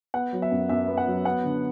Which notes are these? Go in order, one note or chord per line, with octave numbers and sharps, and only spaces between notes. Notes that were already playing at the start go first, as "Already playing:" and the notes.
B3 F#5
F#3
E5
F#2
F#2 E5
B3
F#5
F#3
B3 F#5
D3